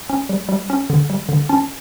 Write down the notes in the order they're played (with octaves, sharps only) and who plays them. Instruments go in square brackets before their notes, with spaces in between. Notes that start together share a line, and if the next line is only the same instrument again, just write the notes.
[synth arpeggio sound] C#4
G3
G3
C#4
D3
G3
D3
C#4 A5